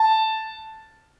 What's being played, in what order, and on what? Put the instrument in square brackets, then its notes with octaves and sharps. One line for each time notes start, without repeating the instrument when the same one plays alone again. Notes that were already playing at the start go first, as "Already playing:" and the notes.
Already playing: [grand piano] A5